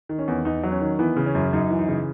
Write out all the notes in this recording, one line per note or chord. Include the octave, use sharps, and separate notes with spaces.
D#3
C#4
E2
E2 D#4
F#3
C#4
D#3
E3 B3
C#3
C#4
F#2
F#2 D#4
E3
D#4
C#3